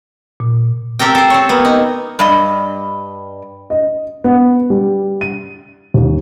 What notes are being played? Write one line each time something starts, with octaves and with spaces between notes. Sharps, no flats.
A#2
C4 G4 A4 A#4 G5
A4 C5
C4 C#5
A#3 B3
D#4
G2 G3 D#5
D#5
B3
G3
D#7
D#2